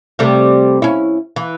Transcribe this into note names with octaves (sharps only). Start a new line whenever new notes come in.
C3 G3 A3
C#4 E4
E3